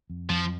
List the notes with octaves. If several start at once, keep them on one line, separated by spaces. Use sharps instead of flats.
F2
F2 F3